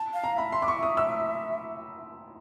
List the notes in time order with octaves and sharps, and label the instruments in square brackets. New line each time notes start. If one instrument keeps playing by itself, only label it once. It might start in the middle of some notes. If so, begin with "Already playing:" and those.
Already playing: [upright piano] A5
[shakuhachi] F5
[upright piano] A#5
[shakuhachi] F5
[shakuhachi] E5 [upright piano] B5
[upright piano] C6
D6
C#6
D#6
E6